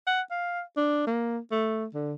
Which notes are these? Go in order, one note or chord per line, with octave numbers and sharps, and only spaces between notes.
F#5
F5
D4
A#3
A3
D3